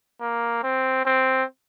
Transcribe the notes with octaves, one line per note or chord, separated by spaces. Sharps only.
A#3
C4
C4